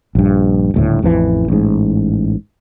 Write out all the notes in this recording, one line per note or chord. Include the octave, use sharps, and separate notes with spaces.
A#1 G2
D#1 D2 A2
A1 F2 D3 E3
A1 G#2